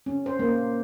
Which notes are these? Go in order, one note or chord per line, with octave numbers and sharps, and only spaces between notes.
C#4
C5
A#3